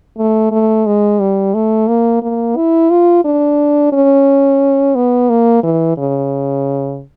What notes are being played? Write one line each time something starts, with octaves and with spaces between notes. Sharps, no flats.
A3
A3
G#3
G3
A3
A#3
A#3
E4
F4
D4
C#4
B3
A#3
E3
C#3